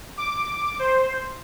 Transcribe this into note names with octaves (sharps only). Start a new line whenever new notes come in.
D6
C5